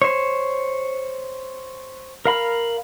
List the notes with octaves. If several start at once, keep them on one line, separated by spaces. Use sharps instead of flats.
C5 C#5
A#4 F5 B5